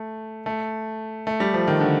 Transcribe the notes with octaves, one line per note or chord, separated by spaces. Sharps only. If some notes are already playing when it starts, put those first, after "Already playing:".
Already playing: A3
A3
A3
G3
F3
D#3
D3